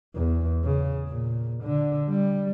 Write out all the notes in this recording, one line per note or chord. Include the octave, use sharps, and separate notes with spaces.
E2
C#3
A#2
D3
G3